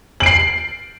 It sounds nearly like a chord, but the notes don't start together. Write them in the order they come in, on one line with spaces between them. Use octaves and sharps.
F#7 D7 C7